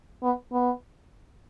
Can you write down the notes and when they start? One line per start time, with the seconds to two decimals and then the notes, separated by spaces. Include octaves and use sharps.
0.23 B3
0.52 B3